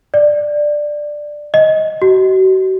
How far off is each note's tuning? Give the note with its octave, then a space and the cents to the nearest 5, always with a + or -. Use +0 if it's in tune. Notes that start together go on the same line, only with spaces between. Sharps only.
D5 +10
D#5 +15
F#4 +40